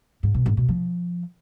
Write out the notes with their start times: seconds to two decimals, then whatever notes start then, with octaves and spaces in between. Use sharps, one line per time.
0.23 G#2
0.34 B2
0.46 G#2
0.57 B2
0.68 F3